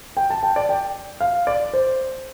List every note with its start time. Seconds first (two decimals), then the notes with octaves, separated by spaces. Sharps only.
0.17 G5
0.30 A5
0.43 G5
0.56 D5
0.69 G5
1.20 F5
1.47 D5
1.73 C5